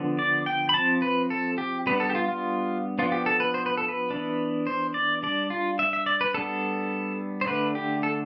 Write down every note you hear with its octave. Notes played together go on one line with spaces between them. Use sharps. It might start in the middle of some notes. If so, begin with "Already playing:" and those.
Already playing: D3 F3 B3 D4
D5
G5
B5
F3 C4 A5
B4
A4
G4
G3 B3 D4 B4
A4
G4
F4
F4
F3 B3 D4 F4
G4
A4
B4
C5
B4
A4
B4
E3 B3 D4
C5
D5
G3 D4 D5
F4
E5
E5
D5
B4
G3 B3 D4 A4
C5
D3 A3 D4 B4
G4
A4